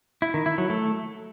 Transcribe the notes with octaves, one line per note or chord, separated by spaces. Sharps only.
E4
D#3
E4
F#3
A3